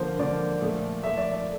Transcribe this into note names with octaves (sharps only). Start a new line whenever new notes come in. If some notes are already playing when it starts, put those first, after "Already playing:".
Already playing: D3 F3 A#3 C5
D3 F3 A#3 D5
A#2 F3 A3
A#2 F3 A3 E5
D5
D5